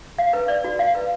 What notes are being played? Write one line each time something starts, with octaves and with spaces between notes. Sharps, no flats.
F5
B4
D5
F#4
F5
B4